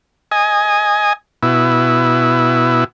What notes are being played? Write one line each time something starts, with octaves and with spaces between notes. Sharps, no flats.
D#5 G#5
B2 E4